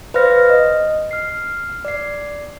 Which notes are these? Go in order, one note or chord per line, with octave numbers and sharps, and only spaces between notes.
B4 C5 D5 F5 F6 A#6
D#5
F6 C7
D5 C7